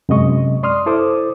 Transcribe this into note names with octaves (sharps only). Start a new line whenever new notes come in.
F#2 C3 G#3 D#5 C#6
D5 C6 D#6 F6
E4 A4 C5 D6 D#6